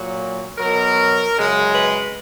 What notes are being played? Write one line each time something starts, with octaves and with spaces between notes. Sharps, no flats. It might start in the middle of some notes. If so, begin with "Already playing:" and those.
Already playing: A#2 F#3
B2 F#3 A#4
F#2 C#3 G#3
B4